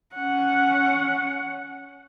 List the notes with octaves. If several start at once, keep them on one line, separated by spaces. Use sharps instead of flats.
C#4 F#5